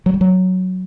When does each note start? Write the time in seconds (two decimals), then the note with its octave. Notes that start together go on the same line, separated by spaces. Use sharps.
0.06 F#3
0.14 G3
0.21 F#3